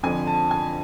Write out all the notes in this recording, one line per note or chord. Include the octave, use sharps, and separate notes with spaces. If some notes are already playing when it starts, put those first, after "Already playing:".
F2 D3 F3 G#5
A5
G#5